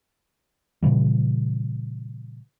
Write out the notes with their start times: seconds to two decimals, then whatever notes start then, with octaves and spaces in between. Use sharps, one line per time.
0.83 A#2 C#3 E3 G3